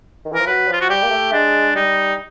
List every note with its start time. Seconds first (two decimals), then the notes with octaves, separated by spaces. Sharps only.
0.25 D#3
0.32 E3
0.35 F3 A#4
0.46 F#3 B4
0.68 F3 F4
0.80 F#4
0.89 G3 G4
1.03 A#3
1.11 A3
1.32 G#3 D4
1.75 G3 D#4